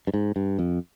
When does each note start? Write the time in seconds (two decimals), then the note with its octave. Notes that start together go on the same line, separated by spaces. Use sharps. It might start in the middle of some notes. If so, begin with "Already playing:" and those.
0.07 G2
0.14 G#2
0.36 G2
0.59 F2